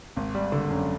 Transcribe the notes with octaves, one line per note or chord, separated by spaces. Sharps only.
G#1
G3
D3
F#2